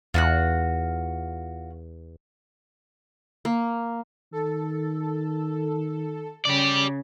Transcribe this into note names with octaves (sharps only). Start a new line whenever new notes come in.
E2 F4 F#4 F#6
A#3
D#3 A4
C#3 G4 D5